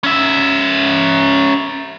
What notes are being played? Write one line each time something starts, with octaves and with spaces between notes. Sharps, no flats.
C#4 E5